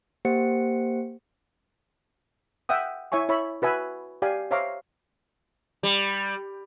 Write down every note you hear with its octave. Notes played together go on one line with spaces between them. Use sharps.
A#3 G4 C5 F#5 C#7
E5 F#5 G5 D#6
E4 C#5 E5 G#5 C#6
E4 C#5 E5 B5
F#4 B4 E5 G#5 B5
G4 D5 F5 G#5
C5 C#5 E5 F5 A#5 D6
G3